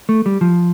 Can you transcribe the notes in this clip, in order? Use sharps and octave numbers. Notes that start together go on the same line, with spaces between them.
A3
G3
F3